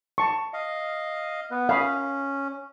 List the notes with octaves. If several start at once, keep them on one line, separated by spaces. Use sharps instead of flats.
A5 C#6
D#5 F5
B3 B4
C#4 F5 B5 D#6